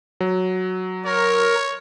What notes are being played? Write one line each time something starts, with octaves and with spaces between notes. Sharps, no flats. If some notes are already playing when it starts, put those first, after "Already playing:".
F#3
A#4 C#5